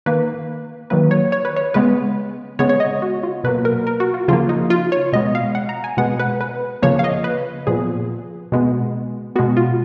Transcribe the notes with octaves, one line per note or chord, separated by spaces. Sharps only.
D#3 A#3 B4
D#3 F#3 A#3 B4
C#5
C#5
B4
C#5
C#3 G#3 B3 B4
C#3 G#3 B3 C#5
C#5
D#5
F#4
F4
B2 F#3 A#3 B4
A#4
A#4
F#4
F4
C#3 F3 A#3 F4
D#4
F4
C#5
B2 G#3 B3 D#5
F5
F#5
A#5
G#5
B2 G#3 B3 F#5
B4
B4
C#3 F3 A#3 C#5
F5
D#5
B4
A#2 F3 B3 G#4
B2 G#3 B3
B2 G#3 B3 F#4
F4